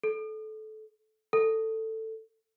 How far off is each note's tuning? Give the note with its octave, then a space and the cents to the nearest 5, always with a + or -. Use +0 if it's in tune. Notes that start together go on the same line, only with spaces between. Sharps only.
A4 -20
A4 +15